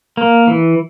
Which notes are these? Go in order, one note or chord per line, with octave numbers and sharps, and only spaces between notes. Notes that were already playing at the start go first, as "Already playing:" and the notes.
A#3
E3